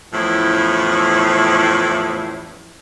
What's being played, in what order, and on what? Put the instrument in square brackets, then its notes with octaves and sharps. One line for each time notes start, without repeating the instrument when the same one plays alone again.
[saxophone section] E2 A2 F3 C#4 E4